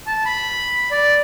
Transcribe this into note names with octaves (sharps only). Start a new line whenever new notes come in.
A5
B5
D5